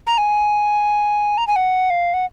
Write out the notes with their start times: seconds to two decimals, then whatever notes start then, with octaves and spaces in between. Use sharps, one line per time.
0.07 A#5
0.18 G#5
1.38 A#5
1.47 G#5
1.56 F#5
1.90 F5
2.14 F#5